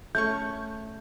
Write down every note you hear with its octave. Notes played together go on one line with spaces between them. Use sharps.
A3 C#4 C#6 G6